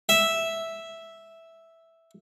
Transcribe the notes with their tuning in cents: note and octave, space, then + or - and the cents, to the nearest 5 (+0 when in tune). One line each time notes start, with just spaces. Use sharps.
E5 -5